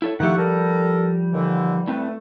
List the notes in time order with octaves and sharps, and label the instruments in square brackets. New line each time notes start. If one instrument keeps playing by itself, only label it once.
[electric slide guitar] E4 A4 C#5
[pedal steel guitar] D#3 A3 [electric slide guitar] F3 G4 [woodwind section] E4 F#5 C#6
[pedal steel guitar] G3 [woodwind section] A4 A#4
[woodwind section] D#2 D3 E3
[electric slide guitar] A2 C4 B4 [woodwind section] A3